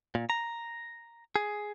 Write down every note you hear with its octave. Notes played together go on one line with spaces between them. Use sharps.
A#2
A#5
G#4